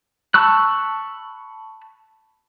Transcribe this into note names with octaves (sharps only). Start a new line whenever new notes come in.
A5 B5 C#6 E6 F#6